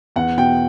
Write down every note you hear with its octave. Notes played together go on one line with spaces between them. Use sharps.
E2 F#5
B2 G5